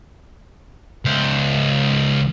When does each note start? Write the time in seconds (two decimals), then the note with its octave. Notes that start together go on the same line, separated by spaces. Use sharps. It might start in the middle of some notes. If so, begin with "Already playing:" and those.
1.05 C#2 C5